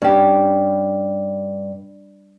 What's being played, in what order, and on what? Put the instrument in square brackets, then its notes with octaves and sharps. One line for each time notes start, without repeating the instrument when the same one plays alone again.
[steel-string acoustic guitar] G2 [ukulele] C#4 G4